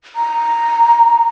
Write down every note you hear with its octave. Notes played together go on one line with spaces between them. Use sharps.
A#5